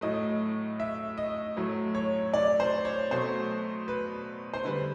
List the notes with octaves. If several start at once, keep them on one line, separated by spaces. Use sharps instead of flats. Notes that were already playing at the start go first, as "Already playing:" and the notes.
A2 F#3 A3 D#5
E5
D#5
A2 F#3 A3
C#5
D5
C5
C#5
B2 F#3 A3 C5
B4
C5
D3 G3 B4